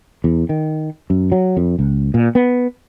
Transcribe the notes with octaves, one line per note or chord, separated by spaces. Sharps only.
E2
D#3
F#2
F#3
F2
C#2
A#2
B3